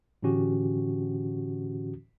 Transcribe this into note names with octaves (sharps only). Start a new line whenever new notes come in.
A2 D3 E3 C#4 F#4 G4